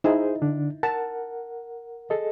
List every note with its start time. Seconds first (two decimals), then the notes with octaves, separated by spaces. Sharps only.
0.04 D#4 E4 G#4 C5
0.42 D3 D4
0.83 A#4 F#5 A5
2.10 G#4 A4 D#5